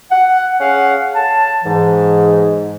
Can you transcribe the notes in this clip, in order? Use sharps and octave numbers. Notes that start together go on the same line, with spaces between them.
F#5
C#4 G#4 F5 F#5
A5
G#2 E3